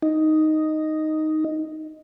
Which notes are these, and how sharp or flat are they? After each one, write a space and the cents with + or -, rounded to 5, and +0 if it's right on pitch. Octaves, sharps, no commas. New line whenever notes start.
D#4 +0